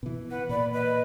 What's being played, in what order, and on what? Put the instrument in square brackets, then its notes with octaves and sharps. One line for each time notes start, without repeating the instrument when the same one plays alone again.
[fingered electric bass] B2 E3
[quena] B4 [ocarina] F#5
[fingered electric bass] A#2 [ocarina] D5 [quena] B5
[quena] B4 [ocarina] D#5